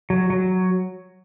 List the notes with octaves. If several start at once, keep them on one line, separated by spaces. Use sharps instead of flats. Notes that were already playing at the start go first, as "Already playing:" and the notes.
F#3
F#3